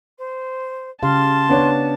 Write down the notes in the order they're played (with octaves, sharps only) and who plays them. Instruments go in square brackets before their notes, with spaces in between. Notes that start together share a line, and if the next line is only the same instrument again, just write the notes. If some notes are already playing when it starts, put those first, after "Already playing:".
[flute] C5
[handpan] C#3 G4 F5 [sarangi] A5 [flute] C6
[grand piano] B3 D4 C#5